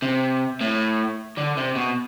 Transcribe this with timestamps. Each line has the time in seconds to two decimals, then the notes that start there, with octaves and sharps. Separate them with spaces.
0.02 C3
0.61 A2
1.38 D3
1.58 C3
1.76 B2